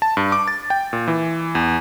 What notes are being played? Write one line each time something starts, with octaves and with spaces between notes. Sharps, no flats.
A5
G2
D6
A6
G5
A#2
E3
E2